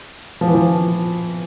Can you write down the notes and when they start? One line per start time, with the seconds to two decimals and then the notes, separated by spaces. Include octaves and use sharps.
0.41 F3
0.48 E3
0.55 F3